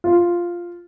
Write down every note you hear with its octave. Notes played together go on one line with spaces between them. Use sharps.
F4